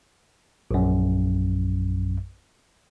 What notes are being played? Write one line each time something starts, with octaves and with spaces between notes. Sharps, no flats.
A#1 F#2